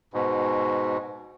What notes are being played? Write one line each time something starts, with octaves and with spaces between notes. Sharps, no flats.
G#2 B2